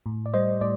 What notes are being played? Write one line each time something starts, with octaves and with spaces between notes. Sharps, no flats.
A2
D5
G3 C5 D#5
A2 D5